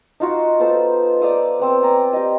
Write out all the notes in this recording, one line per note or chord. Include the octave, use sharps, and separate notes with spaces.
D#4 F4 F#4
B3 F4 A4 C5
D5 F5 D#6 E6
B3 C4 E6
D5 G#5 A#5
G4 D#5